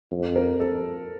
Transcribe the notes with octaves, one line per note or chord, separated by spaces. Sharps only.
F2
A#4
A4